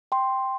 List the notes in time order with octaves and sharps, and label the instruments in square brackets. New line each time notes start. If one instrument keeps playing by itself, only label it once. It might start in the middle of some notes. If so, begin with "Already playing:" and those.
[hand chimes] G5 C6